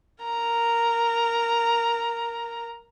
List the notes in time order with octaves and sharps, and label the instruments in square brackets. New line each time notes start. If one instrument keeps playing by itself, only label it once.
[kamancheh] A#4 A#5